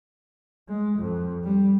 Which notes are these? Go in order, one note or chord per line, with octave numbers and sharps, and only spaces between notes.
G#3
F2
G3